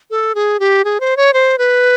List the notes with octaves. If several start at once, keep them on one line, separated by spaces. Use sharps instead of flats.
A4
G#4
G4
G#4
C5
C#5
C5
B4